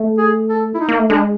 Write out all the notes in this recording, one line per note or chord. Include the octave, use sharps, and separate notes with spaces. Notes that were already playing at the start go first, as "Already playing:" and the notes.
Already playing: A3
G#4
A4
E4
D#4
A#3
A3
G#3 D4